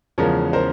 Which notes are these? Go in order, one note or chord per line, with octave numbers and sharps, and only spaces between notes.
E2 C#3 F3 G#3 C#4 A#4
A#4 C5